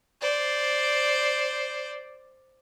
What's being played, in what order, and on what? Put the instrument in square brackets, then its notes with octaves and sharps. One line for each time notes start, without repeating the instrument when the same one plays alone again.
[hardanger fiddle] C5 D5